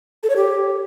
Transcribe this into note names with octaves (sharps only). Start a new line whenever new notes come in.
A4
C#5
G4